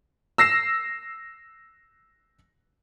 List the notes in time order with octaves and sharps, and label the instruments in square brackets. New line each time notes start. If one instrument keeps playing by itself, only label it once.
[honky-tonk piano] E6 A#6 C7 E7